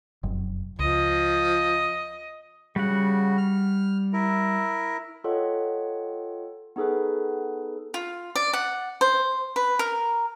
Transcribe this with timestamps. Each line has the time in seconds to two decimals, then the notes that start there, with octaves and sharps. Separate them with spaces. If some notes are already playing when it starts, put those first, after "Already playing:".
0.23 F1 F#2
0.79 C#2 F3 D#5
2.76 C#3 G3 F#4 F#5
3.38 F6
4.13 E4 A#4
5.24 F4 A4 C#5 D#5 F#5 G5
6.76 B3 D#4 G#4 A4 B4
7.94 F4
8.36 D5
8.53 F#5
9.01 C5
9.56 B4
9.79 A#4